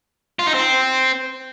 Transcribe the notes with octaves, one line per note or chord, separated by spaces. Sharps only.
F4
D#4
C4